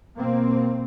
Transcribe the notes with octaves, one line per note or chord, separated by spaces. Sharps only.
B2 A#3 C4